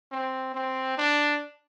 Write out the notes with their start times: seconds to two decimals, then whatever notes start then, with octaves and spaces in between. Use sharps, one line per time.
0.12 C4
0.54 C4
0.98 D4